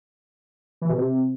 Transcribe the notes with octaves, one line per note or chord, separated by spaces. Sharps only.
E3
B2
C3